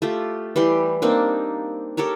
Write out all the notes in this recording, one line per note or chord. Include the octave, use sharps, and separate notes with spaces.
A3 F4 G4
E3 G3 G4 C6
A#3 C4 D4 D#4
G4 A4 A#4 C#5